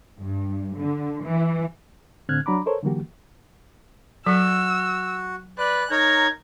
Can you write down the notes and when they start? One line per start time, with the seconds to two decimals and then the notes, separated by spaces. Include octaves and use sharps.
0.20 G2
0.77 D3
1.24 E3
2.29 A2 D3 C4 F6 F#6 G#6
2.46 F#3 D4 A#5 B5 D6
2.66 A4 A#4 C5 C#5
2.83 D3 E3 F#3 A#3 F#4 G4
4.26 F#3 F#4 E6
5.58 B4 D5 F#6
5.91 D#4 A#4 C#5 A#5 G#6